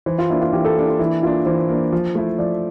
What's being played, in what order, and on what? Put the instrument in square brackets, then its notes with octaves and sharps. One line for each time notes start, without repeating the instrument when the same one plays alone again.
[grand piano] E3 [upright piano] C5
[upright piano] F4
[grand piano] A#3 D4 [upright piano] E4
[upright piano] F4
[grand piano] E3 [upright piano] G4
[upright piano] A4
[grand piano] A#3 D4 [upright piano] G4
[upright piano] F4
[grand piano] E3 [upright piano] E4
[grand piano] A#3 D4 [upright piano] F4
[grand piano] E3 [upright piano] C5
[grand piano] A#3 D4
F3
A3 E4
[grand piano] F3 [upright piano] D5